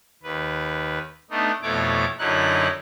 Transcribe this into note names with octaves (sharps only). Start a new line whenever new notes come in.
D#2 B4
A3 B3 D4 D#4
F2 B2 A3 E4 C#5 D6
F#2 D3 F#3 D#4 E4 F#6